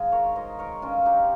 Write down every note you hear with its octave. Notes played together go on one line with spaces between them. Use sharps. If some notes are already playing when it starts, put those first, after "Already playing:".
Already playing: G#2 D#3 F4 G#4
A#4 C#5
C5 D#5
A#4 C#5
G2 F3 C#4 F4
D#4 G4